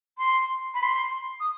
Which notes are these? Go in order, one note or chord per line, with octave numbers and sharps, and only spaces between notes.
C6
B5
C6
D#6